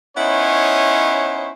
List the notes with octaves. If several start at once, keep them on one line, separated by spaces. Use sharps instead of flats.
B3 C#4 D#4 E4 C5 C#5